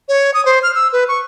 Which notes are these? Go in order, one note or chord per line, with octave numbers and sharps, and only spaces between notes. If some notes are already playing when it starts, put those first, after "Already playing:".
C#5
D#6
C5
F6
E6
B4
C#6